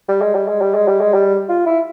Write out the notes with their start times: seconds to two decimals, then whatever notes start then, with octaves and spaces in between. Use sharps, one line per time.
0.08 G3
0.21 G#3
0.35 G3
0.48 G#3
0.61 G3
0.75 G#3
0.88 G3
1.01 G#3
1.14 G3
1.49 F4
1.66 E4